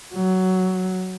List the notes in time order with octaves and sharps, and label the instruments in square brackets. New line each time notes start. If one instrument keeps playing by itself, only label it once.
[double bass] F#3